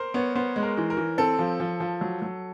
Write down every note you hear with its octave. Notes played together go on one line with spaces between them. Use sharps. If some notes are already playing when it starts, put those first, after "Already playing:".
Already playing: A#4 C5
B3 C#5
B3 C5
G#3
A#4
E3
A#4
E3
C4 A4
F3
F3
F3
F#3
F#3